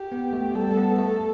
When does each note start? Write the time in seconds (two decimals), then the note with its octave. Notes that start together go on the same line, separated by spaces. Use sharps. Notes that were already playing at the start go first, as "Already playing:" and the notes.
Already playing: G4
0.12 B3
0.33 A3
0.55 G3 A4
0.77 B3
0.99 A3 A4